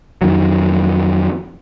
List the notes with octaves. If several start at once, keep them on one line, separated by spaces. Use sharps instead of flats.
F2 D#3 F#3